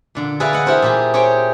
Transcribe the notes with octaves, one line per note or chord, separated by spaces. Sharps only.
A#2 D3
G#4 B4 D5 E5 F5 G#5
D#5 F#5
E4 G4 A#4 C5
A#2 G4 G#4
G4 G#4 C5 C#5 G5